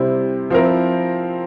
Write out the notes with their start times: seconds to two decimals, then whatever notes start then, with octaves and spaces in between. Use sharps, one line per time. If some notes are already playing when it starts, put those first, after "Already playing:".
Already playing: C3 G3 C4 E4
0.50 F3 C4 E4 A#4